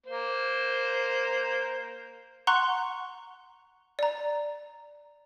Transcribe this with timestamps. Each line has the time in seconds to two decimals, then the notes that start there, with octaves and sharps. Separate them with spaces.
0.06 A#3 C5
2.47 F#5 A#5 C6 C#6 F#6
3.99 D5 A#5